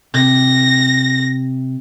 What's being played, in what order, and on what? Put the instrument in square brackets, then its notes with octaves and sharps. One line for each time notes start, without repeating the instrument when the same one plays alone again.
[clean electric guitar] C3 [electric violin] A#6